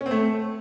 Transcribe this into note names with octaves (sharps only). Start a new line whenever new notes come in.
C#4
C4
A3